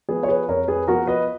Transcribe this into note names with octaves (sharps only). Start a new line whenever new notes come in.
F3 B3 G#4 B4
C#5
G#4 B4
F2 A#4 C#5
G#4 B4
F3 B3 F#4 A#4
B4 D#5